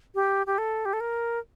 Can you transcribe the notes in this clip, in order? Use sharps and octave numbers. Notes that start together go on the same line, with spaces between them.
G4
G4
A4
G4
A4
A#4